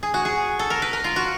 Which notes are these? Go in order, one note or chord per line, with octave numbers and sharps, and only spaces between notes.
G#4
F#4
G#4
A4
A#4
B4
A#4
F4
F#4